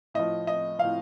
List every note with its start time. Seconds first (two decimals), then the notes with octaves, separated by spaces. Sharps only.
0.14 A2 F3 D#5
0.47 D#5
0.79 A2 F3 F5